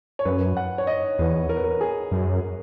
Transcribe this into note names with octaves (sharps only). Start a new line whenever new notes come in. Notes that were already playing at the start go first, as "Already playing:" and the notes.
C#5
F#2 B4
F#5
C#5
D#5
E2 B4
A#4
B4
A#4
G#4
F#2